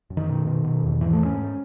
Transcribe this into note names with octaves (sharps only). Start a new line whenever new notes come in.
F#2
D#3
B2
B2
B2
E2
G#2 E3
A3
G#2
C#4
G#2